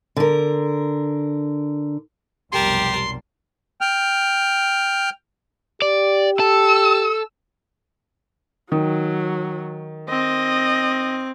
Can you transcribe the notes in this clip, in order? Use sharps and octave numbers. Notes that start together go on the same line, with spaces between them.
D3 A#4
F1 B1 G3 G4 A#4 A5 C6
G5 F6
G4 D5
A4 E6
D#3 F#3
C4 D#5